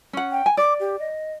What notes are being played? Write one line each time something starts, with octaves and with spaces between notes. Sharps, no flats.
C#4 F#5
G5
G#5
D5 D6
G4
D#5